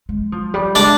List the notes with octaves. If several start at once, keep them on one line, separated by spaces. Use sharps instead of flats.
G#3
F3
G3
G#3 D4 D5